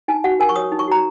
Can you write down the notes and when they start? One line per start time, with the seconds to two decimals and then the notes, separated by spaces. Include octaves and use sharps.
0.08 D#4 G#5
0.24 F#4 F#5
0.40 A#4 G#5
0.49 C#6
0.56 C#5 D#6
0.72 D#4
0.79 C#6
0.88 F#4 A#5